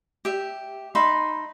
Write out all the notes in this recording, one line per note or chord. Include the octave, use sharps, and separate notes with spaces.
G4 E5
D#4 E5 B5 C6